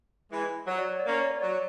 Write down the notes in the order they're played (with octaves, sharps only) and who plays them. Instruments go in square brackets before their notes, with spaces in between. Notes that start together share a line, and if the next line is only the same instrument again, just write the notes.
[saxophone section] E3 G#3
[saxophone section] F#3 [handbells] C#5
[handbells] D5
C#5
D5
[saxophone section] A#3 C#4 [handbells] C#5
[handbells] D5
C#5
[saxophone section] F#3 [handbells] D5
[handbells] C#5